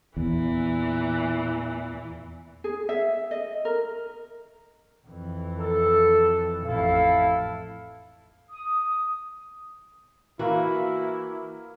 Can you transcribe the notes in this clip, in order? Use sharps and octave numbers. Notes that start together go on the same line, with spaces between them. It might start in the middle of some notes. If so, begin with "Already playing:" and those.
E2 A#2 E3
G#4
E5
D#5
A#4
F2 E3
A4
A1 F2 E4 A4 F5
D#6
E3 A#3 E4 F#4 A#4 F5